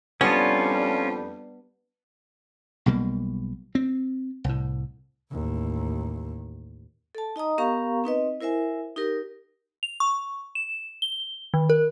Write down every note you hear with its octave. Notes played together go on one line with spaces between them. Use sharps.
F2 G3 B3 C#4 D4 F4
B1 B2 G3 A#3
C4
C2 A2
A1 D#2
A4 A5
D#4 D#5 A#5 D#6
B3 G4 A#4 F5 A#5 C#6
C4 D#4 B4 D#5
E4 A#4 C5 E5 G#5
D#4 G4 A#4
F7
C#6
E7
G7
D#3
A#4